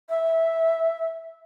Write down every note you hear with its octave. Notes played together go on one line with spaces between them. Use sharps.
E5